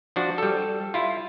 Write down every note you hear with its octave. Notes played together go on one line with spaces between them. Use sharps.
F3 D4 F#4
G3 A4
E4 F4